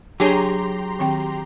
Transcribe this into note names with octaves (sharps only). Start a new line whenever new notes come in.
F#3 D4 G4 G#4 C#5 A5 A#5 C6
D#3 C4 G5